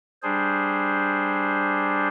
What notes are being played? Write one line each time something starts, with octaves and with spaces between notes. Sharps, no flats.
G3 D4 G#4 C5